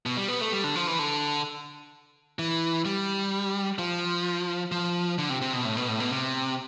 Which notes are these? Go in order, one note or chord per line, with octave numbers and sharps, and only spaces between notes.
B2
G3
B3
A3
G3
D3
F3
E3
D3
E3
G3
F3
F3
D3
C3
C3
B2
A2
B2
A2
B2
C3